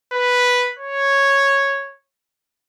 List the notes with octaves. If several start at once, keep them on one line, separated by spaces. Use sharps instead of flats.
B4
C#5